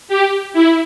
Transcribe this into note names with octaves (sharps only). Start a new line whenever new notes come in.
G4
E4